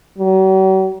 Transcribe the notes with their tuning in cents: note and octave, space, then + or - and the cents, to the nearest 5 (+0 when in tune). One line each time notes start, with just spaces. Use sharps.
F#3 +45